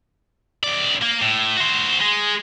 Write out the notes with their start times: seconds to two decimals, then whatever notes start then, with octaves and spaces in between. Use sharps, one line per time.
0.64 C#2 D5
1.02 A#3
1.22 A2
1.57 F#4 C5
2.01 G#3